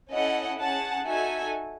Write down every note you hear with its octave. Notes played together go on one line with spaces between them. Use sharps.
C#4 E4 A4 D#5 F#5
C#4 G#4 F#5 A5
D#4 F#4 A4 E5 G#5